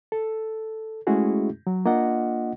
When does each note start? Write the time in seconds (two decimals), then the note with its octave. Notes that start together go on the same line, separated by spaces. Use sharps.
0.12 A4
1.07 G#3 A3 C#4 E4 F#4 G#4
1.67 F#3
1.86 A#3 D4 F4 D#5 F#5